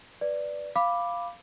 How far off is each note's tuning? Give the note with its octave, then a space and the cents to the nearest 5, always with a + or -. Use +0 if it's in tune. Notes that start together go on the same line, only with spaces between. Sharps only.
B4 +0 D5 +0
F5 +0 B5 +0 D6 +0